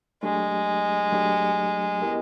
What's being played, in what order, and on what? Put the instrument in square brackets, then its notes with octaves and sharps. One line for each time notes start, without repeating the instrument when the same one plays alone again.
[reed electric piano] F#3 A3 D4 G4 [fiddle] G#3
[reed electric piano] F#3 A3 D4 G4
B3 E4 G4 A#4 D#5